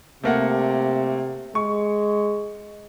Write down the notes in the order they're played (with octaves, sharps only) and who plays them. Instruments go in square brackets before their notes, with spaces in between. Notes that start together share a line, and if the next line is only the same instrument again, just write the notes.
[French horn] C3 [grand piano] A3 A#3 F#5
[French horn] G#3 [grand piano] C#6